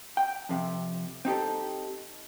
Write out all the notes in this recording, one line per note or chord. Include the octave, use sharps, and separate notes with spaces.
G5
F2 C3
C4 D#4 G4 A4